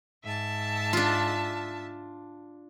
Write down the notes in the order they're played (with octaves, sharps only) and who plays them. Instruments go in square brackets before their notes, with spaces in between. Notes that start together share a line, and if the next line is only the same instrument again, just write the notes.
[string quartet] G#2 E5 A5
[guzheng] D4 F4